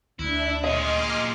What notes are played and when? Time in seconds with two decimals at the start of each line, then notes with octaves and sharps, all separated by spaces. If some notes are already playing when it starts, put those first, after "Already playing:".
0.19 D2 D4 E4 E5
0.64 A#2 G#4 D#5 C6 D6 F6 C#7